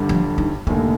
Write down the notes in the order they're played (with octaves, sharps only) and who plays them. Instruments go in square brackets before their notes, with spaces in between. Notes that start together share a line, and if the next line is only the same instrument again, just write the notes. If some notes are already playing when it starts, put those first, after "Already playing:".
Already playing: [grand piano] G1 G2 D3 G3
[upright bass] F3
D#4
[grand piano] F1 D#2 D3 [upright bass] A#3